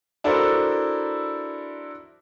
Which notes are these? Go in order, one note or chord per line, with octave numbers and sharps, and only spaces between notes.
D4 E4 F#4 A4 A#4 C5